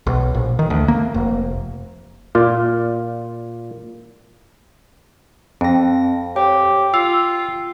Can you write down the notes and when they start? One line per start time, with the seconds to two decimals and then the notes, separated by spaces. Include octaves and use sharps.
0.07 B1
0.35 A#1
0.59 D#3
0.70 D2
0.88 A#3
1.14 F1
2.35 A#2 F4 D5
5.61 F2 C4 A#6
6.36 G4 C#5 G5
6.94 F4 F5 E6